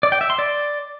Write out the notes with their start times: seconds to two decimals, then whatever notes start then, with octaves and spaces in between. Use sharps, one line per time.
0.03 D5
0.12 G5
0.21 E5
0.30 C6
0.39 D5